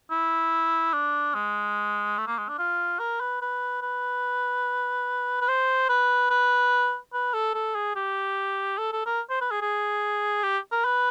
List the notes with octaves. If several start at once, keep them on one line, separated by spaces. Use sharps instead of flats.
E4
D4
G#3
A3
A#3
G#3
D4
F4
A#4
B4
B4
B4
B4
C5
B4
B4
B4
A4
A4
G#4
G4
A4
A4
A#4
C5
B4
G#4
G#4
G4
A#4
B4